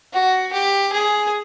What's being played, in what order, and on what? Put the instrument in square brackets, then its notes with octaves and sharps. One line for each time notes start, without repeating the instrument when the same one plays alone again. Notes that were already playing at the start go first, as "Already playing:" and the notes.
[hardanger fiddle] F#4
G4
G#4